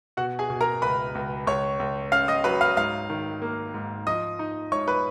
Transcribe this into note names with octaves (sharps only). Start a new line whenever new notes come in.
B2 F#4 F#5
G#4 G#5
B2
A#4 A#5
C#2 B4 B5
C#2
C#2 C#5 C#6
C#2
C#4 F5 F6
D#5 D#6
F#3 B4 B5
F5 F6
G#2 F5 F6
D#3
A#3
G#2
F3 D#5 D#6
D#4
G#2 C#5 C#6
B4 B5